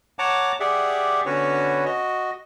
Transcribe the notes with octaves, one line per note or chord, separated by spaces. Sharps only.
C#5 F#5 A5 A#5 D6
G4 G#4 D5 E5 F#5
D3 B3 C#4 F#4 B4 C#5
F#4 D#5